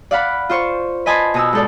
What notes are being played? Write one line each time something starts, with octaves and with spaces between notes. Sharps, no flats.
D5 F5 F#5 B5
F4 C5 C#6
B4 D#5 G#5 A5 B5 C6
B2 D#6 E6
G#2 A4 D5